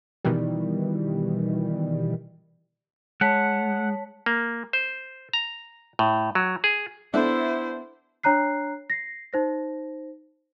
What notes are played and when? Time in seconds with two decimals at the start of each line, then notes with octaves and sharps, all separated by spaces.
0.25 B2 D#3 E3 G3
3.21 G#3 C#5 F#5 A5 B6
4.26 A#3
4.73 C5
5.33 A#5
5.99 A2
6.35 F#3
6.64 G#4
7.14 B3 D4 E4 A4 C5 E5
8.23 D4 C#5 A#5 F#6 C7
8.90 A#6 C7
9.33 D#4 C5 A#6